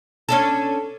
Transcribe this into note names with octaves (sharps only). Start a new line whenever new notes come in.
C#4 D4 A4